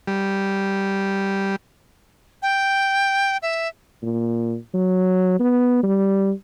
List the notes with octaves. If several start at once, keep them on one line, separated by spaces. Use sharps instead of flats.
G3
G5
E5
A#2
F#3
B3
G3